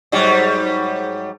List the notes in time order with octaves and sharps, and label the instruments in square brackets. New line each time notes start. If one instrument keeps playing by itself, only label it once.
[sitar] G#2 F#3 G3